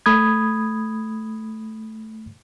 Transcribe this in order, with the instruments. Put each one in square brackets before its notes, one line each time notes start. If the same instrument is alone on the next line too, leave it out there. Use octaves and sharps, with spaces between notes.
[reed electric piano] A3 B5 D#6 G#6